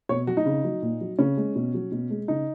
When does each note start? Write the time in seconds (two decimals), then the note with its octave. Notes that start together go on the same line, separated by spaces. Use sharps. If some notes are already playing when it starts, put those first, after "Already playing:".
0.09 B2 C#5
0.27 F#3 F#4
0.37 D#4
0.46 C#3
0.64 F#3
0.82 A#2
1.01 F#3
1.19 C#3 C#4
1.37 G#3
1.56 B2
1.74 F#3
1.92 B2
2.10 G#3
2.28 C#3 D#4